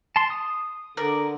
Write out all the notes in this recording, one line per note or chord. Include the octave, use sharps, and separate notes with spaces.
A5 C6
D#6
D3 A#4 D5